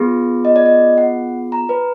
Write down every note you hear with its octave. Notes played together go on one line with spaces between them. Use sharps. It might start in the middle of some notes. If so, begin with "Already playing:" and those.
Already playing: B3 F4 G#4
D#5
D5
D#5
F#5
A#5
B4